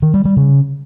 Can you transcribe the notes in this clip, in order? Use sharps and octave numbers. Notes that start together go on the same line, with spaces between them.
D#3
G3
G3
C#3